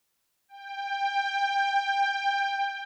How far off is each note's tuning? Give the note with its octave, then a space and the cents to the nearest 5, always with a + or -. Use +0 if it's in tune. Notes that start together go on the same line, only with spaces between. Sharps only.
G5 +20